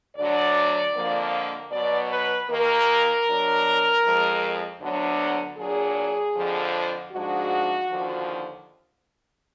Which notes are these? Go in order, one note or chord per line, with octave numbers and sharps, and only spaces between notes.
D2 D3 F#3 D4 D5
F2 D3 F3 A#3
B2 F#3 B3 D5
B4
D#2 D#3 A#3 A#4
B2 F#3 D4
F2 F3 G#3
D2 D3 F#3 B3 D4
A#2 F#3 D4 G#4
F2 D3 F3
G#2 F3 G#3 D4 F#4
D#2 D3 F3